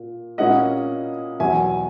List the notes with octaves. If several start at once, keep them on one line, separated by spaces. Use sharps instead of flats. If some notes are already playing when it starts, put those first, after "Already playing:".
Already playing: A#2
A#2 A#3 C#4 E4 D#5 F#5
E2 B2 F#3 E5 G#5